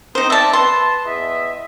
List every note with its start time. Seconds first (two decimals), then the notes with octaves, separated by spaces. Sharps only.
0.15 G#2 C4 D#4 C5 D#6
0.30 D5 E5 A5
0.53 B4 A5 C6
1.05 E2 D#5 E5